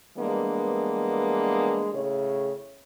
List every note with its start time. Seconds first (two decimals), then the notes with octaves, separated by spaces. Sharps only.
0.17 E3 G3 G#3 A#3 B3 D4
1.93 A2 C#3 G#4 C#5